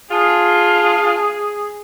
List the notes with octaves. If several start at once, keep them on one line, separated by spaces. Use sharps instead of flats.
D4 F4 G#4